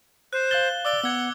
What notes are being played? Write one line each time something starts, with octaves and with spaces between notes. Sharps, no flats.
C5 F#6
F5 F#6 A6 G7
D5 D6 E6 G7
B3 F#5 E6 G#6